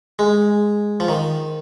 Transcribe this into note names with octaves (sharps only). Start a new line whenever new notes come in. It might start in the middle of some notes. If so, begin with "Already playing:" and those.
G#3
F3
D#3